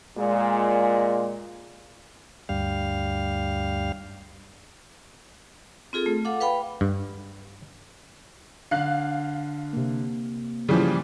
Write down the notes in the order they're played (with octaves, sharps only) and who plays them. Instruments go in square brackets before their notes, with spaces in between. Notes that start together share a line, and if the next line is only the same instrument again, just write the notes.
[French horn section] A#2 G#3
[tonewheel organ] D2 G2 G3 F5
[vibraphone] C4 F4 G#4 A4
A3
A4 F5 F#5 D6
B4 F5 G5 B5
[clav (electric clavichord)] G2
[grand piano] D3 [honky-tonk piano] F5 F#6
[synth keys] C3 A#3
[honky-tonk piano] C#3 E3 F3 [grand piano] G3